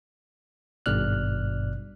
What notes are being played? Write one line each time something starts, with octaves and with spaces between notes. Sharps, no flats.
G#1 G2 B2 D5 F6 F#6